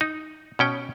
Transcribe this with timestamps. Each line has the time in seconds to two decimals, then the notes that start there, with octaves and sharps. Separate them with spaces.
0.01 D#4
0.59 B2 C#4 G5